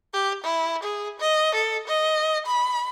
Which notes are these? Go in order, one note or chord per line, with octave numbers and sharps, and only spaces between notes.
G4
E4
G#4
D#5
A4
D#5
B5